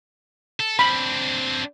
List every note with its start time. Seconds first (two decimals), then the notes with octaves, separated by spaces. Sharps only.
0.60 A4
0.79 C4 D4 B5